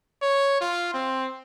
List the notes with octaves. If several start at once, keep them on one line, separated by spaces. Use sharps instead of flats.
C#5
F4
C4